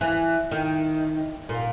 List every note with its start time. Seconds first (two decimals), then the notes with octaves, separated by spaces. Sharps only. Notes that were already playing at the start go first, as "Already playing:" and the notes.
0.01 E3
0.51 D#3
1.49 A#2